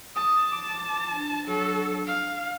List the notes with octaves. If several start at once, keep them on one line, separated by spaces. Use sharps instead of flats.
A5 D#6
D6
D4
F#3 A4
F5